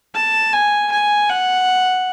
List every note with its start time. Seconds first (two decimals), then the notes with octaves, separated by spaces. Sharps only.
0.15 A5
0.53 G#5
0.91 G#5
1.30 F#5